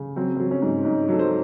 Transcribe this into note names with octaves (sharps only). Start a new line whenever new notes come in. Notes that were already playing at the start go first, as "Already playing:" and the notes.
Already playing: C#3
F#3 C4
F#3 C4
C#4
G#2
G#2 D#4
F#3 A4
C5